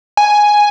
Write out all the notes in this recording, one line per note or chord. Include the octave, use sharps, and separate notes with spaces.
G#5